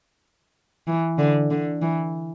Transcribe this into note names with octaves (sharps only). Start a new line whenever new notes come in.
E3
D3
D3
E3